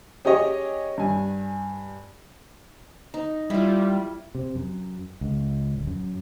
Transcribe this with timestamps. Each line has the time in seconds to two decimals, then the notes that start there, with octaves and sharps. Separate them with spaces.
0.25 C#4 G4 G#4 C#5 D#5
0.98 G2 G#5
3.14 D#4
3.50 G3 E4 F4
4.35 C3
4.55 F#2
5.21 C#2
5.74 D1
5.87 F#2